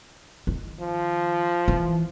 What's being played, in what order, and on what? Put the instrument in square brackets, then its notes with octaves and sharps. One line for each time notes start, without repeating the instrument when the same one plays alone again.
[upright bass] D#3
[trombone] F3
[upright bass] E3